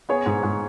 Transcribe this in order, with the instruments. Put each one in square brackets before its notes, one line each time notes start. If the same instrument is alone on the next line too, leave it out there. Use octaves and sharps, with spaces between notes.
[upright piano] B3 G#4 C#5
[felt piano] G#2
G#2